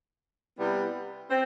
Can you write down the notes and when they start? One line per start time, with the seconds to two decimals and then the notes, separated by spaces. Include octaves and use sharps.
0.57 C3 G3 B3 E4
1.29 C4